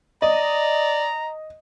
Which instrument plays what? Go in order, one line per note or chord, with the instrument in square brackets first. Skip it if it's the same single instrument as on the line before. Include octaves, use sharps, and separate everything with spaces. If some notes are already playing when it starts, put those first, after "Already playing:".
[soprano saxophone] D5 [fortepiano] D#5 [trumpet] A#5